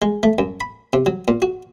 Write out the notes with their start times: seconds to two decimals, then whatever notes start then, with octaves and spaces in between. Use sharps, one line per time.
0.02 G#3
0.23 A3
0.38 F#2
0.61 B5
0.93 C3
1.06 F#3
1.28 A#2
1.42 F#4